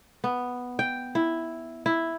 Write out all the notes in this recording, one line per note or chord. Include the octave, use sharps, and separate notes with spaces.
B3
G5
E4
E4